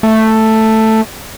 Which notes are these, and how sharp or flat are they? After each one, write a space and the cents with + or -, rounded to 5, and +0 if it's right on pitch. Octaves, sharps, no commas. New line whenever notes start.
A3 +5